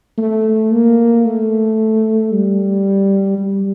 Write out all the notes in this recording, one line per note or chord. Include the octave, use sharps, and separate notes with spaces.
A3
A#3
A3
G3
G3